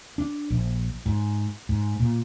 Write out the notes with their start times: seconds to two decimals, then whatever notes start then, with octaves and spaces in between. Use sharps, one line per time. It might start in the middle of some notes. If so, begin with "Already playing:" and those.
0.18 D4
0.50 A#1
1.06 G#2
1.69 G#2
2.00 A#2